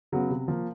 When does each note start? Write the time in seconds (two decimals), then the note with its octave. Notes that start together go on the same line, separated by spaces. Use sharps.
0.12 C#3 F#3 B3
0.30 C3
0.48 F3 A#3